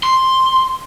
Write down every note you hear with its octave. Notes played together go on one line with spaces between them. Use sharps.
C6